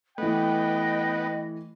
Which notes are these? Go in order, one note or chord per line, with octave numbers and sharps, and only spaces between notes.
E3 A3 B3 D#5 G5